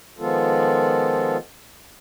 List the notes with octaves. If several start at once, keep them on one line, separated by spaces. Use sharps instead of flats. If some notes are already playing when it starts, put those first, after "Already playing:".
D#3 F3 G#3 B3 F4 A4